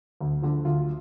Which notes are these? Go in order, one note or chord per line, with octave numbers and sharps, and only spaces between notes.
D2
D3 F3
D2 F4